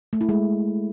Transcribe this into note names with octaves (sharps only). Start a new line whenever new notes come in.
A3
E4
G#3